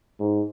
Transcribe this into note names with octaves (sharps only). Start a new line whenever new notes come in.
G#2